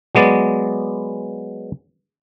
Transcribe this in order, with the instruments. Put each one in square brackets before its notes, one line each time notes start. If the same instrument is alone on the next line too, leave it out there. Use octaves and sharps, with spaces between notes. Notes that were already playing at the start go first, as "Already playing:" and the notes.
[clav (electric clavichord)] F#3 G#3 B3 D5